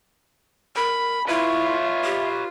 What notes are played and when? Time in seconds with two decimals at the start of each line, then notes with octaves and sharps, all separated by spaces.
0.76 A#4 B5
1.28 E4 F4 B4 C#5 E5
2.04 G4